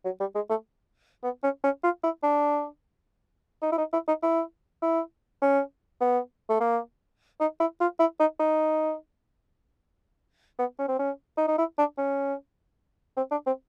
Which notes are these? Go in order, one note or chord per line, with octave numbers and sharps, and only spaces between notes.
F#3
G3
G#3
A3
B3
C#4
C#4
F4
E4
D4
D#4
E4
D#4
E4
D#4
E4
E4
C#4
B3
A3
A#3
D#4
E4
F4
E4
D#4
D#4
B3
C#4
C4
C#4
D#4
D#4
E4
D4
C#4
C4
D4
C4